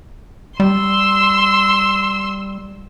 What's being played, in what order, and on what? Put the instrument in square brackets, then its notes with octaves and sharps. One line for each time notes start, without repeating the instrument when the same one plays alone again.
[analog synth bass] G3 [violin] C6 E6